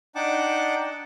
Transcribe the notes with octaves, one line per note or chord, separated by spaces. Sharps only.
D4 D#4 F#5 G5 A5 D6